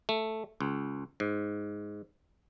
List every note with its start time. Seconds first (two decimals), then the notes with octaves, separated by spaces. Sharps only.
0.09 A3
0.61 C#2
1.20 G#2